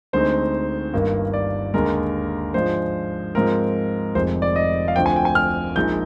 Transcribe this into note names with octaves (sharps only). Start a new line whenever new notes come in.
D2 D3 G#3 C4 D#4 C5
G1 G2 D#3 A#3
D5
D#2 D3 G#3 A#4
G#2 F3 G#3 D4 C5
G#2 F3 C4 A#4
F1 F2 D#3 G#3 C5
D5
D#5
F5
D2 D3 F3 C4 G5
G#5
G5
G#5
F6
A#1 A#2 G#3 D#4 G6